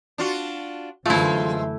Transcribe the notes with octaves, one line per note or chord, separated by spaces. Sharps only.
D4 F4 F#4
F#2 D3 E3 G#3 A3 E4 F4 C5